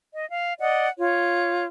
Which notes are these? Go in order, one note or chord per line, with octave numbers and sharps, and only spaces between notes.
D#5
F5
D5 D#5 F#5
F4 C#5